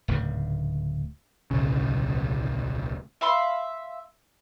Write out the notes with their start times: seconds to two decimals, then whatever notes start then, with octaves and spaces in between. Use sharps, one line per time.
0.08 D1 D2 G#2 C#3
1.51 D1 B1 C#3
3.21 E5 F5 B5 C6